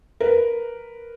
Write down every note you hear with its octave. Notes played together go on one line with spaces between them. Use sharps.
A#4 B4